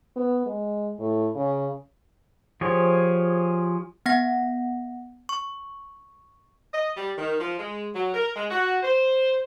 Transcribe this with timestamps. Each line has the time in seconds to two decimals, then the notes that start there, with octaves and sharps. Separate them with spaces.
0.16 B3
0.46 G#3
1.00 A2
1.35 C#3
2.61 F3 G4 G#4 C#5
4.06 B3 F#5 A#6
5.29 C#6
6.73 D#5
6.96 G3
7.17 D#3
7.40 F3
7.58 G#3
7.94 F#3
8.14 A#4
8.35 G#3
8.49 F#4
8.83 C5